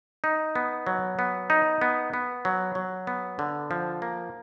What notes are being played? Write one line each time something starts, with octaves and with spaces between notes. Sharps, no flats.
D#4
B3
F#3
B3
D#4
B3
B3
F#3
F#3
B3
D3
F3
A#3